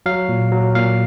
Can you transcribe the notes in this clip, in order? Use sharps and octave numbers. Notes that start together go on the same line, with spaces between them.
F#3 F5
A#2
F#3
A#2 F5